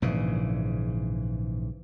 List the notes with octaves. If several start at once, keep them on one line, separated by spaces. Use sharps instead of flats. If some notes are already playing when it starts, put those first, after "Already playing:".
A#1 G#2 C#3 E3